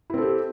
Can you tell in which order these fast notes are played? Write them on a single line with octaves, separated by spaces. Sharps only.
E4 C4 A4 G4